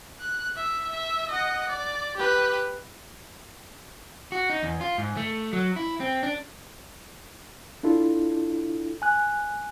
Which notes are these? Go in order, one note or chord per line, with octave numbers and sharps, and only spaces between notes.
F#6
E5
E5
D#5 F#5
D5
G4 B4
F#4
D#4
E2
F4
G#2
A3
F#3
E4
C4
D4
D4 E4 F4 A4
G#5 F#6